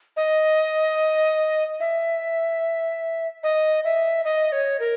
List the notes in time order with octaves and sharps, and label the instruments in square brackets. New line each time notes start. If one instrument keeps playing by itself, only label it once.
[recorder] D#5
E5
D#5
E5
D#5
C#5
A#4